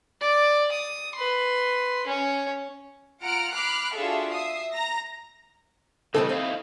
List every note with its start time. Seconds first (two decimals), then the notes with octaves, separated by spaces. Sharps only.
0.21 D5
0.72 D#6
1.16 B4 C6
2.07 C#4 C#5
3.22 F4 F#5 A#5 F6 D7
3.52 B5 D6 F6 F#6 C7
3.93 D4 F4 F#4 G#4 A4 E5
4.33 E5 D#6 C7
4.72 A#5 A#6
6.14 C#3 E3 G3 C4 D#4 A4
6.29 C4 D#4 E4 F5